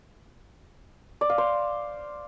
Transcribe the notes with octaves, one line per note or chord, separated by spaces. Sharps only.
D5
F5
C5